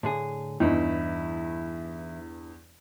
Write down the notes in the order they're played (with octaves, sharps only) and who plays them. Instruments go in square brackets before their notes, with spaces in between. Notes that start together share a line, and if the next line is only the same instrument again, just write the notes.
[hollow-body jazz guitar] A2 D3 G#4
[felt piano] E2 G2 [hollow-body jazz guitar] E3 D#4 E4